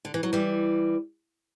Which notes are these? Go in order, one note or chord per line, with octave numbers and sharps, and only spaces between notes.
D3
E3
F#3
E3 G3